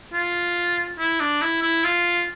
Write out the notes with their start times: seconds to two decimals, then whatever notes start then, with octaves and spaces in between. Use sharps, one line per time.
0.13 F4
0.99 E4
1.20 D4
1.42 E4
1.62 E4
1.84 F4